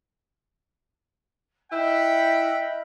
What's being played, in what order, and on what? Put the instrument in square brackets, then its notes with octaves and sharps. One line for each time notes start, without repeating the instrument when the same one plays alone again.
[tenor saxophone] E4 [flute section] D#5 E5 F6 [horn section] F#5 G5 B5